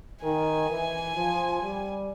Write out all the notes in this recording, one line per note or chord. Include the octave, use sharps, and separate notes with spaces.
D#3 G#5
E3
F3
G3